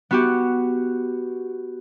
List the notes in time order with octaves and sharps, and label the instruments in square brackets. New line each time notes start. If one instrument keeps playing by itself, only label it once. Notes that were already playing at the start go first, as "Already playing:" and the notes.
[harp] B3 F#4 G4